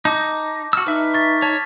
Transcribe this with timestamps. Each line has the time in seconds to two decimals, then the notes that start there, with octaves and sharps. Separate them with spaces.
0.05 D#4 A5 D6
0.73 F#4 E6 F6
0.87 D#4 B4 E5
1.14 C#6 A6 B6
1.42 C#5 A5